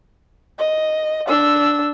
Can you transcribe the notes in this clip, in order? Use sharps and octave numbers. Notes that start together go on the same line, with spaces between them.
D#5
D4 E6